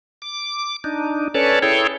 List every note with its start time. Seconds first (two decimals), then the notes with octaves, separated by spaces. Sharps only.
0.22 D6
0.84 D4 D#4
1.34 C#4 A4 B4 C#5 D5 A5
1.63 E4 G#4 A4 C#5 G5